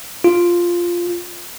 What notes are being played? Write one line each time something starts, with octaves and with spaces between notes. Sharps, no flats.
F4